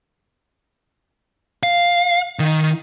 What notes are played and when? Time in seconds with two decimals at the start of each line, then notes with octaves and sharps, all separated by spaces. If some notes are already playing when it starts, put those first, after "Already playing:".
1.63 F5
2.39 D#3